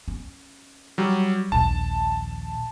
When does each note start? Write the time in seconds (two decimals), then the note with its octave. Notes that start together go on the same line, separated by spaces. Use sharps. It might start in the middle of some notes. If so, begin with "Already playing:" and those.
0.08 C#4
0.98 F#3 G3
1.52 A#1 D#2 A5